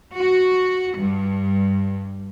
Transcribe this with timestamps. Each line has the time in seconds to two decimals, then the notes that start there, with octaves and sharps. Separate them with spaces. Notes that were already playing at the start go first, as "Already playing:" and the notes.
0.14 F#4
0.96 G2